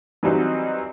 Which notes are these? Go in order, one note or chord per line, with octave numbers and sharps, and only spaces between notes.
E3 F#3 G3 C4 D#4 D#5